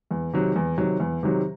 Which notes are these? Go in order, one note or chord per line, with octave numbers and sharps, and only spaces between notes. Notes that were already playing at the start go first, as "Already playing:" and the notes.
E2
C3 D#3 F#3
E2
C3 D#3 F#3
E2
C3 D#3 F#3